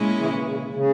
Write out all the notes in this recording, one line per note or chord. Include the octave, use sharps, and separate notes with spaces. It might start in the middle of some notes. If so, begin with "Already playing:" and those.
Already playing: A#2 G#3 C#4 E4
C#3 E3
C#3
C#3